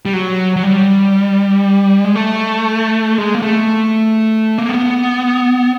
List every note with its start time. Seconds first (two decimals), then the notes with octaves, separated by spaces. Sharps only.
0.06 G3
0.13 F#3
0.56 F#3
0.63 G3
2.05 G#3
2.15 A3
3.18 G#3
3.35 A#3
3.42 A3
4.58 A#3
4.69 B3